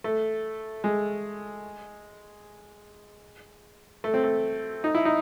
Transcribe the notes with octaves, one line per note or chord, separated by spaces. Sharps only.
A3
G#3
A3
C4
A3
D#4
E4
D#4